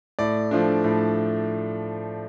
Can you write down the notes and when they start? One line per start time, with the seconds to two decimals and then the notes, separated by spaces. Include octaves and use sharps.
0.19 A2 D5
0.51 F3 A3 D4
0.84 A2